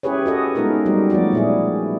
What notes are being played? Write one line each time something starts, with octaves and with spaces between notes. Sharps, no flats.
C#4 E4 G4 G#4 B4 C#5
F#4 A4 D#5
G#3 B3 D#4 F4 A#4
F#3 G3 A#3 D#4 G4
F3 A3 B3 F#4 D5
A#2 E4 G#4